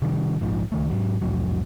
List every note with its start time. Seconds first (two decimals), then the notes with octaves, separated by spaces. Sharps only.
0.02 C3 D#3 G3
0.41 A#1 G#2 F3
0.72 C#2 D#3 A3
0.90 G#2 F#3
1.21 C2 F2 A2 F#3